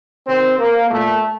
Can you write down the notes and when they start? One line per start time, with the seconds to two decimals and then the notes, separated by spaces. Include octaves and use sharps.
0.28 C3 D#3 C4
0.59 A#3
0.91 A#2 A3